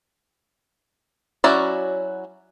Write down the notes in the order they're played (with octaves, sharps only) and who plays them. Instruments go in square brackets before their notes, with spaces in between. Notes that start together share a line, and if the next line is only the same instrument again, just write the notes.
[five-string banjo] F#3 C#4 E4 F#4 D5